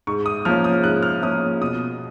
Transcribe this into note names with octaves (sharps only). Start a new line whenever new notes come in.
G#2 C#6
D#6
F3 A#3 C#4 F6
D#6
G#2 F#6
F6
F3 A#3 C#4 D#6
B2 D#6